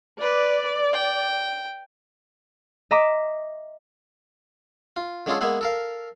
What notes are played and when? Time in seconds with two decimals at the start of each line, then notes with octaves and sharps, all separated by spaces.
0.20 B4 D5
0.93 G5
2.91 D#5 E5 A#5 D6
4.96 F4
5.26 D3 G#3 C#4 F4 G#4 A4
5.41 G#3 A#3 B3 G#4 E5 F#5
5.61 A4 A#4 F5